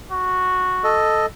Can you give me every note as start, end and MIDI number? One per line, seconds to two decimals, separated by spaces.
0.11 1.00 66
0.84 1.26 69
0.84 1.26 75